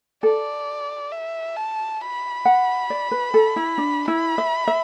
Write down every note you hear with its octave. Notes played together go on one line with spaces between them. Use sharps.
A4 D5
E5
A5
B5
F#5
D5
B4
A4
E4
D4
E4
E5
E5